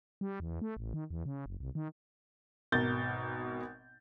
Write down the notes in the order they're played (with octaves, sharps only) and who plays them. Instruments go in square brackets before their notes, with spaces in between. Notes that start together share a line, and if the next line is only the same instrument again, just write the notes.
[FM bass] G3
E2
A3
A1
D#3
E2
C#3
F#1
C2
D#3
[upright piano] G#1 B2 A#4 G6 A6